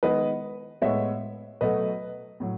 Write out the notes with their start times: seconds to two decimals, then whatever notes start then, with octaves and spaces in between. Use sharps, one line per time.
0.03 D#3 G#3 B3 B4 D#5
0.82 A2 G#3 B3 C#5 E5
1.61 B2 F#3 A3 B4 D#5
2.40 A2 F#3